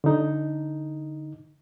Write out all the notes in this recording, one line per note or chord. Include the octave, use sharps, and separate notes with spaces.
D3 D#4